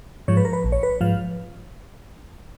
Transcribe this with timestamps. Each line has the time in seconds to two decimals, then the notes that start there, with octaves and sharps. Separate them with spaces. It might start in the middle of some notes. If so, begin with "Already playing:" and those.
0.28 G#2 F3 C#5
0.37 B4
0.45 A#4
0.53 B4
0.64 A#1
0.72 C#5
0.83 B4
1.01 G#2 F3 F5